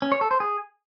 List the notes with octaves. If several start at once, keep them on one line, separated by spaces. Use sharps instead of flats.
C#4
C#5
A4
C5
G#4